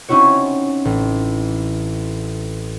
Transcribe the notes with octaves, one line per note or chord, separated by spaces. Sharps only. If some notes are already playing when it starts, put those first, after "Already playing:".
C4 C#4 D#4 E4 F#4 C#5
A1